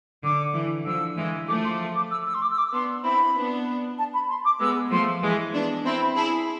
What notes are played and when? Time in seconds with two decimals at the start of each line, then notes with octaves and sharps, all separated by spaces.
0.23 D3 D6
0.54 E3
0.85 D3 F3 E6
1.17 E3 G#3
1.48 F3 A3 D6
1.64 C6
1.95 D6
2.11 E6
2.26 E6
2.34 C6
2.41 D6
2.50 E6
2.57 D6
2.73 B3 D4 C6
3.04 C4 E4 B5
3.35 B3 D4
3.98 A5
4.13 B5
4.29 C6
4.44 D6
4.60 G#3 B3 E6
4.91 F3 A3 C6
5.22 E3 G#3
5.53 B3 D4
5.85 C4 E4 C6
6.01 B5
6.16 E4 G#4 A5